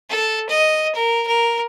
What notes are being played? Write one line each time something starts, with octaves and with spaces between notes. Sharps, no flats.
A4
D#5
A#4
A#4